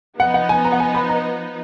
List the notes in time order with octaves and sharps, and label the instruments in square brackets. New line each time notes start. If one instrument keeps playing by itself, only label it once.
[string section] F3 B3 D#4 [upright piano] F#5
[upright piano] F#5
G#5
A#5
F#5
G#5
B5
A#5